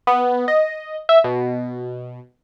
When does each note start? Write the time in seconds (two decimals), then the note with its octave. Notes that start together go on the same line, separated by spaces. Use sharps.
0.07 B3
0.48 D#5
1.09 E5
1.24 B2